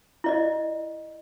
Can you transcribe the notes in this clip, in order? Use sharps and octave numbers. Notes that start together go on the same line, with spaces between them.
E4 D5 D#5